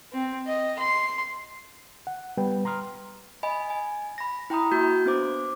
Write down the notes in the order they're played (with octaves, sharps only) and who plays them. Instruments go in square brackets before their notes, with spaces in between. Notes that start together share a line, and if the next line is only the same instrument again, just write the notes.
[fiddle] C4
D#5
C6
[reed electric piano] F#5
G3 B3 B4 G5
A#5 C6 D#6 F6
[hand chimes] D#5 G#5 B5
G#5
B5 A#6
E4 G5 A#5 B5 D#6
A#3 F#4 G6
B3 D4 C5 D6